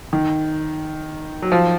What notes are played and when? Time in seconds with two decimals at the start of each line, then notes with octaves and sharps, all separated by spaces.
0.13 D#3
1.42 F#3
1.52 F3